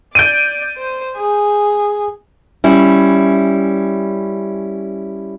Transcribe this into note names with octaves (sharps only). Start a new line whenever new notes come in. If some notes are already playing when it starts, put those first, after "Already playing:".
D5 G6 D7 D#7
C5
G#4
G3 C#4 E4